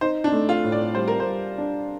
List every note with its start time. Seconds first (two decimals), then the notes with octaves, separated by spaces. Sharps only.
0.01 D#4 C5
0.24 D4
0.33 A3
0.49 F4
0.64 A2
0.72 D5
0.95 G3 C5
1.08 A#4
1.20 C5
1.27 G3
1.58 D4